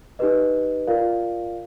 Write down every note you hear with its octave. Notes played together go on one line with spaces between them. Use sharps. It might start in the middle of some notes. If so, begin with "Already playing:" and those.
D#4 G4 B4 D#5
F4 A#4 D5 F5